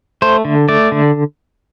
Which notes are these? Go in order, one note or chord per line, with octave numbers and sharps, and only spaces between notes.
A3 C5
D3
A3 D5
D3